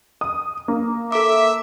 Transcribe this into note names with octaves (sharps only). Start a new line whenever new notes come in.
D#6
A#3
A4 E5 D6